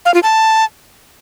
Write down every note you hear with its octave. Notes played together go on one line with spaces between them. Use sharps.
F5
F4
A5